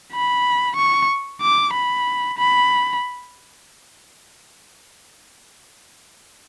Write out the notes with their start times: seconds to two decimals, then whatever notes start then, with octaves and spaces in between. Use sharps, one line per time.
0.13 B5
0.77 C#6
1.41 D6
1.73 B5
2.38 B5